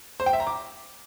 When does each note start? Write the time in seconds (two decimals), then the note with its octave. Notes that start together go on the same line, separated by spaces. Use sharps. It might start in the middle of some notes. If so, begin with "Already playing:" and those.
0.20 C5
0.26 G5
0.33 E5
0.40 A#5
0.47 D6